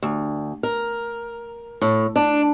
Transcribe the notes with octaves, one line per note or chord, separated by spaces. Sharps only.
D2
A#4
A2
D4